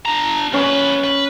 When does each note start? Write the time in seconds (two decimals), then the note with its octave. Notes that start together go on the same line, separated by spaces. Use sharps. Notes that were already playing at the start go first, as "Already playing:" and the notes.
0.06 D4 A#5
0.54 F#2 C#4 B4
1.04 B4